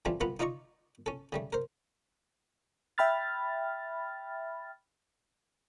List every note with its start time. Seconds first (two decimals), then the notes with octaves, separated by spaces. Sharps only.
0.05 E3 G3 A3 C4 D4 F4
0.21 C2 B3 F4 F#5 A#5 B5
0.39 D#4 F4 D5 D#5 A#5 C#6
1.06 C#4 A4
1.32 C#3 G3 A3
1.53 A#4 C5
2.98 E5 G5 B5 F6 A6